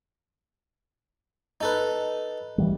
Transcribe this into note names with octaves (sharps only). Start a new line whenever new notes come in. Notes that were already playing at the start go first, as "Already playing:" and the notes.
D#4 A4 B4
E3 F3 G3